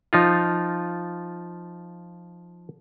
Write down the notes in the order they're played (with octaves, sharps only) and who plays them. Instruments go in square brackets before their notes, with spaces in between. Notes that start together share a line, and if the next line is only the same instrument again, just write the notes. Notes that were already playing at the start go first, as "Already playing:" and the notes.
[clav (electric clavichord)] F3 D#4 F4